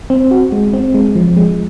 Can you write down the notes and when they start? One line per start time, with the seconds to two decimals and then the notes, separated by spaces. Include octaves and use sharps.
0.10 C4
0.31 F#4
0.52 G#3
0.73 C4
0.94 G#3
1.15 F3
1.37 G#3